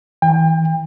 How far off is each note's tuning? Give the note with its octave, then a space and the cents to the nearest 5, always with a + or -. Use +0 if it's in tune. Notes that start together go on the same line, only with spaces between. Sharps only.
E3 -30 G5 +35